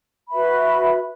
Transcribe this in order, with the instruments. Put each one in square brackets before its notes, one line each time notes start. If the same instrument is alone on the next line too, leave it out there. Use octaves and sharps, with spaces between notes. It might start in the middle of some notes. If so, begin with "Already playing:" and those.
[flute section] F#4 B4 E5 B5